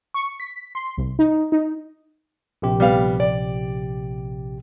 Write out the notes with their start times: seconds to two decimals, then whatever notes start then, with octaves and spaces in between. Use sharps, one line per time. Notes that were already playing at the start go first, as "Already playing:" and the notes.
0.14 C#6
0.40 B6
0.75 C6
0.97 C2
1.19 D#4
1.52 D#4
2.62 A#1 C3 G4
2.80 G3 B3 F5
3.20 D5